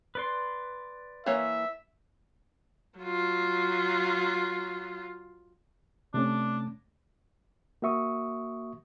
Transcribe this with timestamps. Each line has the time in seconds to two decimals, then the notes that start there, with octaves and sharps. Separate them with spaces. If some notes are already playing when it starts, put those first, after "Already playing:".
0.15 B4 D5 C6
1.26 E3 A#3 C#5 E5
2.99 F#3 F4
6.14 C3 A3 C#4 D4
7.82 A#3 F#4 E5 C#6 D#6